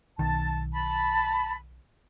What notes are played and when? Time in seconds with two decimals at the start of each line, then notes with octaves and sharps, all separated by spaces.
0.19 B1 D#3 A5
0.73 A5 B5